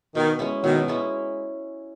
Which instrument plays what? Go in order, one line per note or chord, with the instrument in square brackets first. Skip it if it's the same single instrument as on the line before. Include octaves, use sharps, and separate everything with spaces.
[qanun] B2 [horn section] D#3
[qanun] G#3 C#4 E4
[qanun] B2 [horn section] D#3 F#3
[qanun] G#3 C#4 E4